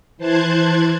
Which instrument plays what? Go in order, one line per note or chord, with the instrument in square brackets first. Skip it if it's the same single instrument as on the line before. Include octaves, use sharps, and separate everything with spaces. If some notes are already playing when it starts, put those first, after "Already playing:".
[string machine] E3 C5 A5 F#6 G#6